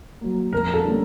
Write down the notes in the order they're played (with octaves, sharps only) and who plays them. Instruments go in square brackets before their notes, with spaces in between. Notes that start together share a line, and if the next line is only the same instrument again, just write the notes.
[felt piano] F#3 A#3
[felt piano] F2 [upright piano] A#4
[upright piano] A4
[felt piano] D3 G3 A#3 C#4